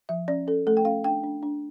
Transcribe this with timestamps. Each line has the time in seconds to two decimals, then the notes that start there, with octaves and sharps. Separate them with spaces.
0.09 F3 E5
0.28 C#4 D5
0.47 C#4 A4
0.67 A3 A4
0.77 G5
0.85 C#4 F5
1.04 D4 G5
1.24 D4
1.43 D4